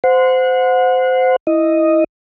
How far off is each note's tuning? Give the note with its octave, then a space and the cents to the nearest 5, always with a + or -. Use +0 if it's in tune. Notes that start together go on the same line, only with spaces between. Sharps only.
C5 -20 F#5 -30
E4 +0 D#5 +0